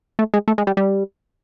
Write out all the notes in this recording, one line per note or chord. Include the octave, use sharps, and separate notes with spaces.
A3
G#3
A3
G#3
G3
G3